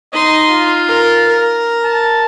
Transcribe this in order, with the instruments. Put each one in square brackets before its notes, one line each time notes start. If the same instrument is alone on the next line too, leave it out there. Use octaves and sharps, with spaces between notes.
[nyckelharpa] D#4 C6 [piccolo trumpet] D#5
[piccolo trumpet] F4
[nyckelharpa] A#4
A#4
[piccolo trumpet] A5